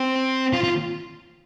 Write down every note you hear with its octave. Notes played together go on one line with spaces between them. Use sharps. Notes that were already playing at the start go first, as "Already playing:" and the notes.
Already playing: C4
F4
F4